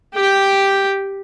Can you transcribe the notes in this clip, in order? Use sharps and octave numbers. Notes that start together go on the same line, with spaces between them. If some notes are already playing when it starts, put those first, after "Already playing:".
G4 G5